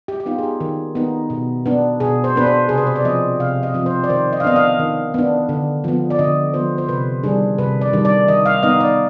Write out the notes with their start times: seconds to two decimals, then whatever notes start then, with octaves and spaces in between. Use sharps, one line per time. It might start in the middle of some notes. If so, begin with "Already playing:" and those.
0.08 G4
0.20 G4
0.26 B3 D#4 F4
0.38 G#4
0.44 G4
0.60 D#3
0.95 B3 D#4
1.30 B2
1.66 B3 D4
2.00 B2 G#4
2.24 C5
2.36 B3 D4 B4
2.47 C5
2.69 C3 G#4
2.78 B4
2.87 C5
2.96 D5
3.05 F3 C4 D#5
3.40 C3 F5
3.63 D#5
3.74 F3 C4
3.86 C5
4.04 D5
4.09 D#3 C5
4.32 D#5
4.40 F5
4.44 B3 D4 D#5
4.56 F5
4.79 D#3
5.14 B3 D4
5.49 D3
5.84 F3 B3
6.10 D5
6.19 D3 D#5
6.54 F3 B3 C5
6.78 C5
6.89 C3 B4
7.23 D#3 G3 D4 G#4
7.58 C3 B4
7.81 D5
7.93 D#3 G3 D4
8.05 D5
8.28 D#3 D#5
8.46 F5
8.63 B3 D#4 D#5
8.80 D5